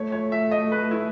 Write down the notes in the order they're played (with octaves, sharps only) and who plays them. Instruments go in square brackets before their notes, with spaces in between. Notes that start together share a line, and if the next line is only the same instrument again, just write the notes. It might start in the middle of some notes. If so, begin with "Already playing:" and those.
Already playing: [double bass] A3 [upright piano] C#5
[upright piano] C#5
E5
D#5
B4
E4